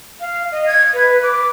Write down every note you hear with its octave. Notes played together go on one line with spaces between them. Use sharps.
F5
D#5
G#6
B4
D6